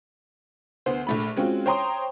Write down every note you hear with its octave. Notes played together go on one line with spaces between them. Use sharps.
D2 B3 C5
A#1 A3 B5
G#3 C4 C#4 F4 F#4
C5 C#5 G5 A#5 C6 D#6